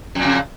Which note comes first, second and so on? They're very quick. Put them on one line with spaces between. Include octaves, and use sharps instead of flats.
F2 A#2 C#3